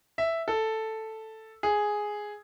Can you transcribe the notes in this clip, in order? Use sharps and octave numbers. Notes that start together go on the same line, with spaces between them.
E5
A4
G#4